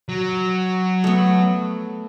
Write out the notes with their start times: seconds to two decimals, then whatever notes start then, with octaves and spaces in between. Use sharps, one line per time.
0.09 F#3
1.04 A3 B3